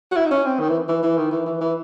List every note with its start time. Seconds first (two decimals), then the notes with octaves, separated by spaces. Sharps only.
0.12 F#4
0.16 E4
0.26 D#4
0.31 C#4
0.45 C4
0.60 D#3
0.69 E3
0.89 E3
1.03 E3
1.18 D#3
1.32 E3
1.46 E3
1.61 E3